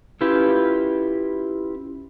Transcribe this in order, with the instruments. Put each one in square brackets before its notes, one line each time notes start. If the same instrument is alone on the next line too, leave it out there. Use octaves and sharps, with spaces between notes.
[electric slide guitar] C#4 E4 F4 G4 B4